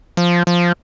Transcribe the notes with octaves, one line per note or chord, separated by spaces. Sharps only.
F3
F3